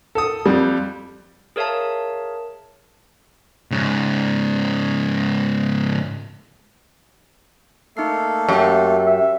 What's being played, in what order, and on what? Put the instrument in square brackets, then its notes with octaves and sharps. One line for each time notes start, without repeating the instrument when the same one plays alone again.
[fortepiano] A4 D#6
F2 G3
[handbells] G#4 A#4 C#5 E5 F5 A5
[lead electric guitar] G#2 C#3
[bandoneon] A3 A#3 A4 [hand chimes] D#4 F6 C7
[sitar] F#2 [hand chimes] G4 G5
[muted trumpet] E5